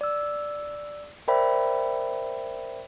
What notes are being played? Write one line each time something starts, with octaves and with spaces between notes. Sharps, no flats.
D5 E6
A#4 C5 D5 E5 G5 B5